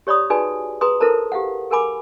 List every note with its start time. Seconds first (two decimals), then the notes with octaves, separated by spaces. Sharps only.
0.07 G4 C#5 D5 B5 D#6
0.30 D#4 F#4 G#4 B4 D5 G#5
0.81 G#4 B4 A#5 C6 D#6
1.00 E4 A4 A#4 C5 A5 A#5
1.32 G4 F5 F#5
1.71 G#4 A#4 F#5 G#5 B5 D6